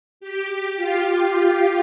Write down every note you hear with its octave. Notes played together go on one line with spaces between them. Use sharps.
G4
F4